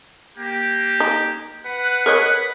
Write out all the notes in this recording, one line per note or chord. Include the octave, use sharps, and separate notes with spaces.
A#3 G4
D#4
B4 F#5
A#4 C#5 D#5